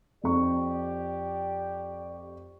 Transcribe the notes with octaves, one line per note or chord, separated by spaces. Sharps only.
F2 G4 D5 C#6